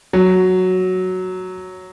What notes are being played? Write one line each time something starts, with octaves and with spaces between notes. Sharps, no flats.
F#3